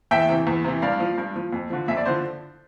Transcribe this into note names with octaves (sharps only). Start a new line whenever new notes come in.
E2 E5 G5
C3 E3
E2
C3 E3
G2 D5 F5
F3
G2
F3
F2
D3 F3
F2 E5
D5
D3 F3 C5